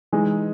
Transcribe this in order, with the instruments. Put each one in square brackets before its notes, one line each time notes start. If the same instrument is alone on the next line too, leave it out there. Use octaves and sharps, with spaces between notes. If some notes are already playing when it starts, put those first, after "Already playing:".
[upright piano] E3 G#3 D#4